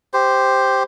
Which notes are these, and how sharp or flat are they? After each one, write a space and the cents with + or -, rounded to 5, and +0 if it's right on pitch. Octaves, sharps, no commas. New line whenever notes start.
G4 +0 C5 +0